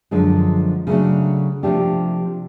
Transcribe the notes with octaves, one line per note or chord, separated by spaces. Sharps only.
F#2 D3 F3 G#3
C#3 F#3 A3 D4
C3 F3 A3 D4 G4